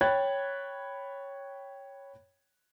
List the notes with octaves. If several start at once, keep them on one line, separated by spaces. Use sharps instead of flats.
C#5 G5 B5 F#6 G#6 A6